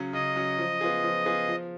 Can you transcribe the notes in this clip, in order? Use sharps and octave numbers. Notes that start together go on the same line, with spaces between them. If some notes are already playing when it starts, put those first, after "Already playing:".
Already playing: C#3 F#3 C#4
C#3 D#5
F#3 C#4
F3
B3 F4 G#4
F3
B3 F4 G#4
F3